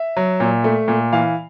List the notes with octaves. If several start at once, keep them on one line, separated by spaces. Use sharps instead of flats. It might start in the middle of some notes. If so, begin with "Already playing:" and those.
Already playing: E5
F#3
A#2
A3
A#2
E3 F5